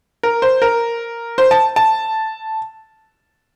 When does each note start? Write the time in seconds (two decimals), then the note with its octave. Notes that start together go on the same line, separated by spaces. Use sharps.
0.23 A#4
0.42 C5
0.62 A#4
1.38 C5
1.51 A5
1.76 A5